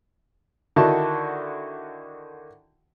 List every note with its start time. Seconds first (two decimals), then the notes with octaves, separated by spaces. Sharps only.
0.76 D3 D#3 E4 F#4 A5